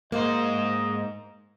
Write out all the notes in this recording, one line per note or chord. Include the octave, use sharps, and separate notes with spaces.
G#2 A#3 C5 D#5